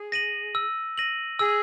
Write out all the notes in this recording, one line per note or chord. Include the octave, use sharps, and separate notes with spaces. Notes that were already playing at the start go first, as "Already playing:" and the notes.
Already playing: G#4
A#6 D#7 F#7
E6
A#6 D#7 F#7
G#4 E6